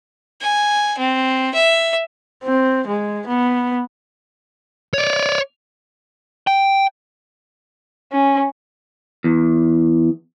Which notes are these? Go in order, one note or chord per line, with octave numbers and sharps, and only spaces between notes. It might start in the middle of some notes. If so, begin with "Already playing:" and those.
G#5
C4
E5
C4
G#3
B3
C#5 D5
G5
C#4
E2